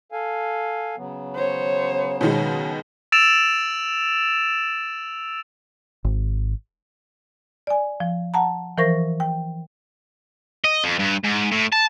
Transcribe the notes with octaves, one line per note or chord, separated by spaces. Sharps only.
A4 F5 G#5
C#3 F#3 B3
C5 C#5
B2 D#3 G#3
E6 A6 D7 E7 F7
G#1
D5 G#5
F3
F#5 A5 A#5
E3 F3 A#4 C5 C#6 A#6
G5
D#5
F2
G2
G#2
A2
A5